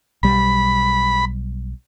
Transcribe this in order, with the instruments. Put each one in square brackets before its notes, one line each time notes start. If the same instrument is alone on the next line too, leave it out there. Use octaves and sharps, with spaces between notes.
[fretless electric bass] B1 G3 [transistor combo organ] B5